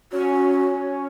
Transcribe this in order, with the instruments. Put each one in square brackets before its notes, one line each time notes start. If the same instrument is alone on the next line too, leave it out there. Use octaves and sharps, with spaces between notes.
[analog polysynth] C#4 [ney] F#4